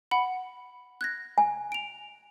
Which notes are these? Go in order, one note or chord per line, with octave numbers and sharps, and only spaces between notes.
F#5 B5
F#6 G#6 A#6
G#5
D7 F7